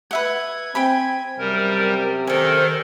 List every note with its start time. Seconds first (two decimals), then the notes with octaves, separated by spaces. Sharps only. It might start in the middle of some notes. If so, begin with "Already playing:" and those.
0.11 B4 E5 F#5 G#6
0.75 C4 G5 G#5 B5
1.38 F#2 C3 G3 A#4
2.27 D#3 A4 A#4 C5 D5 G#5